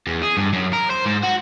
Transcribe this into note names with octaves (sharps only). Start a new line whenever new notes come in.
E2
G#4
G2
F#2
A#4
C5
G#2
F#4